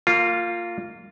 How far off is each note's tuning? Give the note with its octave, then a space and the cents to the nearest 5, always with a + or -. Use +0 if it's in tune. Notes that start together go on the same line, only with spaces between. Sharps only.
A#3 -30 F4 +0